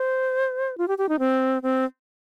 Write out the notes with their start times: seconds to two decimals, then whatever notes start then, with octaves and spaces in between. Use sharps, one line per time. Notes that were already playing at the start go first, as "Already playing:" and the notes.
Already playing: C5
0.78 F4
0.88 G4
0.98 G4
1.09 D#4
1.19 C4
1.63 C4